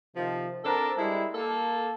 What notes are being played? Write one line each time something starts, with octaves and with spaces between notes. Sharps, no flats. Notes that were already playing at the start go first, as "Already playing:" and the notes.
C3 D#3 F3
C4 D4 A4 A#4 A5
G3 G#3 E4
A#3 A4